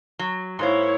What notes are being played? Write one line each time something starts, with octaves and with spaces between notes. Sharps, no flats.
F#3
G#2 A#3 E4 C5 C#5